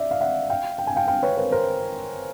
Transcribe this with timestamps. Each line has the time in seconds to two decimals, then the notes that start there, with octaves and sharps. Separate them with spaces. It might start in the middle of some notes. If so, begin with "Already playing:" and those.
Already playing: D5 E5
0.11 F5
0.21 E5 F#5
0.50 F5 G5
0.78 G5
0.87 G#5
0.96 F5 G5
1.08 F5 G5
1.23 B4 C#5
1.37 A#4 C5
1.52 A#4 C5